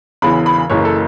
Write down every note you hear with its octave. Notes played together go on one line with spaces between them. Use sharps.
E1 E2 C#3 E3 B5
B5
F#1 F#2 C#3 E3 C#5
A4